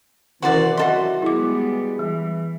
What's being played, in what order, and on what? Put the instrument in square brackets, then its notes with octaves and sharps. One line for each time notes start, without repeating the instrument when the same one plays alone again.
[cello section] C3 [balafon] D#3 C#4 A#4 [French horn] E3 [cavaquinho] F#4 C5 D5
[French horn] F#3 [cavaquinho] F#4 A4 C6 [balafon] D#5 E5
[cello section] G3 G#3 B3 [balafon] E4 D6 [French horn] G#4
[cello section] E3 [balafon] G3